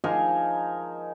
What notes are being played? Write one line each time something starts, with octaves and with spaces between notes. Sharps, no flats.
F3 D#4 G#4 A#4